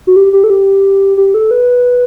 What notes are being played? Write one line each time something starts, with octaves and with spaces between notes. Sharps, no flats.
F#4
G4
G4
A4
G4
G4
A4
B4